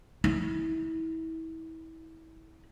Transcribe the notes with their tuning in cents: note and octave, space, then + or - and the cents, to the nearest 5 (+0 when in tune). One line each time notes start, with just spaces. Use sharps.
E4 -30